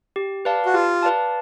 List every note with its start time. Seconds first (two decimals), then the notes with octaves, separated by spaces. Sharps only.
0.16 G4
0.45 B4 D5 F5 A5
0.66 F#4
0.74 F4 G4
1.03 B4 D5 F5 A5